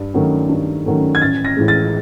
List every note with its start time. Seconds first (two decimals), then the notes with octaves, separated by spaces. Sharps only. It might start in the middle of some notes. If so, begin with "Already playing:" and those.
Already playing: G2
0.14 D#3 F#3 A3 C#4
0.49 G2
0.86 D#3 F#3 A3 C#4
1.15 G#6
1.21 A1 A6
1.45 A#6
1.57 A2 E3 G#3
1.68 A6